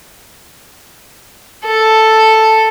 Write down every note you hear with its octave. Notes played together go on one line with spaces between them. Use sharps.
A4